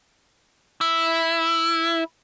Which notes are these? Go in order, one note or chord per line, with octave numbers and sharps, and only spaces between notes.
E4